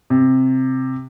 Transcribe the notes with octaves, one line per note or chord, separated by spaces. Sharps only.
C3